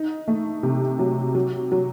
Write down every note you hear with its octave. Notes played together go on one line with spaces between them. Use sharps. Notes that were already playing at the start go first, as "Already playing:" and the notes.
Already playing: D#4
A3
C3
F#3
F#3
F#3